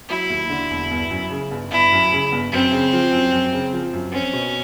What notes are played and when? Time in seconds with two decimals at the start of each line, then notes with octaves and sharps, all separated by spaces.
0.09 F#3 E4
0.30 D#2
0.50 D3
0.71 E1
0.91 G1
1.11 F#2
1.30 C#3
1.51 G1
1.71 G1 E4
1.92 F#2
2.12 C#3
2.32 G1
2.52 F#2 C4
2.72 C#3
2.93 F3
3.13 F#2
3.32 F#2
3.53 C#3
3.73 F3
3.93 F#2
4.13 C4 C#4
4.33 B2